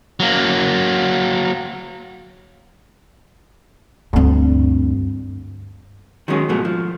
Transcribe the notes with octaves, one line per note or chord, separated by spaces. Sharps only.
F#3 A#3
D2 G2 C4
D#3 F#3 G#3 C#4
G#2 B2 F3 F#3 A3
F3